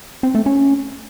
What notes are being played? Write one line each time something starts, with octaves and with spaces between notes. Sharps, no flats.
C4
A3
C#4